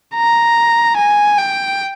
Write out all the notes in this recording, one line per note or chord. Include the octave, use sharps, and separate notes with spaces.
A#5
G#5
G5